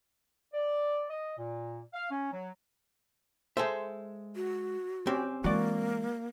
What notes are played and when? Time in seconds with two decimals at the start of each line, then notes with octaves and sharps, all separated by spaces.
0.54 D5
1.10 D#5
1.37 A#2
1.93 F5
2.10 C#4
2.32 F#3
3.57 G#3 A4 C5 E5
4.36 F#4
5.07 C4 C#4 G4
5.44 E3 G#3 A#3 F#4 D5